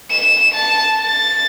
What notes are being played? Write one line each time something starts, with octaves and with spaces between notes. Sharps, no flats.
E7
A5
A6